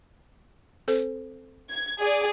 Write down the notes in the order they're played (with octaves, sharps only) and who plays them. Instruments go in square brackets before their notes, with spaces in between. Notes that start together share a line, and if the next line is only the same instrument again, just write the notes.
[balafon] C4 A4 C5
[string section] G#6
G#4 D5